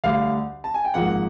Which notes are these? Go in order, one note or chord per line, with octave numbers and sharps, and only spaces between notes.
D2 D3 G3 F5
A5
G#5
G5
G#1 G#2 F3 A#3 F#5